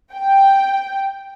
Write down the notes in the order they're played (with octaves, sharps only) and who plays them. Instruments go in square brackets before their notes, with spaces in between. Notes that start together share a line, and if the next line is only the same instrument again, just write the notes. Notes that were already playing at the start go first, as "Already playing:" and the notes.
[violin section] G5